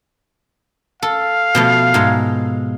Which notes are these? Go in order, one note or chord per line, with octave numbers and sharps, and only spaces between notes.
A4 F5
B2 F3 A3
G#2 G#3 A4